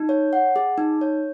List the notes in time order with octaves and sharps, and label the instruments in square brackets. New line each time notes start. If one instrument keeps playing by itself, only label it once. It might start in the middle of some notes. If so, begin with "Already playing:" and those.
Already playing: [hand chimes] D#4
C#5
F#5
G#4
D#4
C#5